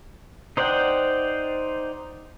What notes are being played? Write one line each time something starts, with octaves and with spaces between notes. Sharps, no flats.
D#4 C5 D5 F#5 G5